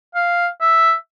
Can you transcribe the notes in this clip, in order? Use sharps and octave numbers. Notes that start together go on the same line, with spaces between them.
F5
E5